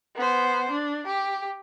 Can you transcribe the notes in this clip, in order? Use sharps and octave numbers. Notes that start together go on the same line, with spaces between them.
B3 C5
D4
G4